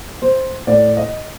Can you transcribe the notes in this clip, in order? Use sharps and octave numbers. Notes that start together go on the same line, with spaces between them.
C5
A2 A3 D5
D#5